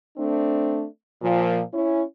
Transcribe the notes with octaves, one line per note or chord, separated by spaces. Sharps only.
A3 C4 D4
A#2 F3
C#4 E4